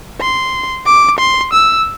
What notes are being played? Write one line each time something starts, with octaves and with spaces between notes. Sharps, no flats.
C6
D6
C6
E6